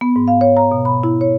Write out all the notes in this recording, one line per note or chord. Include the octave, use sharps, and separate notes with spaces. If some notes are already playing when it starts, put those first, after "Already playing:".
B3
G#2
F5
C#5
A#5
B2
B5
E4
C#5